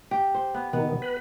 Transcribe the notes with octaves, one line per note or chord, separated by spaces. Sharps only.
G4
C5
B3
B2 D#3 B3
B4